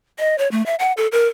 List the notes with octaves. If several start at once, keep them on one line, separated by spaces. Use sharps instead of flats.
D#5
C#5
A3
E5
F#5
A4
A#4